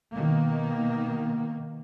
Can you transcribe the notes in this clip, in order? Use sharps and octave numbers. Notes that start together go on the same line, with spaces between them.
B2 D#3 A#3